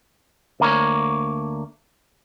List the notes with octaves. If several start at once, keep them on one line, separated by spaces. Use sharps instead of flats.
D2 A#3 C#5